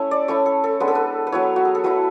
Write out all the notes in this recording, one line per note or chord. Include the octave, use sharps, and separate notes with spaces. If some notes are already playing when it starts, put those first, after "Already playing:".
Already playing: A3 C#4 E4 E5
D5
A3 C#4 E4 C#5
A4
A4
G#3 B3 D4 B4
A4
B4
B4
F#3 B3 E4 C#5
F#4
G#4
A4
F#3 A3 E4 B4